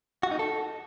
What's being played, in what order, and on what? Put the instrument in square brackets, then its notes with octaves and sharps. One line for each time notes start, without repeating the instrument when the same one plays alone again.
[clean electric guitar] F#4
D#4
A4